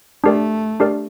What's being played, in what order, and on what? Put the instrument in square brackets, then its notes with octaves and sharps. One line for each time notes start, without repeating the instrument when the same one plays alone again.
[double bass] A3 [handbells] D4 G4 A#4 D5
[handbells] D4 G4 A#4 D5